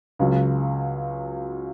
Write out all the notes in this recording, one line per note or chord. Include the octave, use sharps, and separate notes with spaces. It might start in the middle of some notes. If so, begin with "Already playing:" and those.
C#2 C#3 F#3